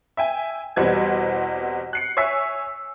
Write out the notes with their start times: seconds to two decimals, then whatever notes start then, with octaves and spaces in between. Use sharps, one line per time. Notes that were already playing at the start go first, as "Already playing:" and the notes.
0.17 E5 G5 G#5
0.76 E2 B2 G3 C4 B4 G#6
1.93 F#6 C7 C#7
2.17 C#5 E5 G#5 E6 B6